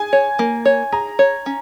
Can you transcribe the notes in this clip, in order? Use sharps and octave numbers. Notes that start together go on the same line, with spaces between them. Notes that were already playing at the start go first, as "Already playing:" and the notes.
Already playing: G#4 G#5
C#5
A#3
C#5
G#4 A#5
C#5
C#4